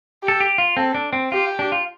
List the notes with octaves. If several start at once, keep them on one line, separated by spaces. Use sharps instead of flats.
G4 A4
G4
F4
C4 A4
D4
C4
F4 G4
D4
F4